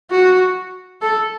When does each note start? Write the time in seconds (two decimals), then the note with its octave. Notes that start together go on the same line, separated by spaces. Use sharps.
0.11 F#4
1.02 A4